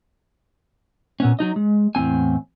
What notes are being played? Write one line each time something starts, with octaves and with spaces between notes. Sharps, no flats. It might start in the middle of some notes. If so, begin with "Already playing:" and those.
A#2 B3 C#4
F#3 D#4 D#5
G#3
E2 A2 C4 G#5